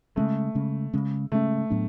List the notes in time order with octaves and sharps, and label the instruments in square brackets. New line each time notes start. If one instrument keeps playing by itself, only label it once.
[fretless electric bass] C#3 G#3 C#4 [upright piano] A3
[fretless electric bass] C#3 G#3 C#4
C#3 G#3 C#4
[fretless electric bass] C#3 G#3 C#4 [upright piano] A3
[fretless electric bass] A2 F#3 B3 D4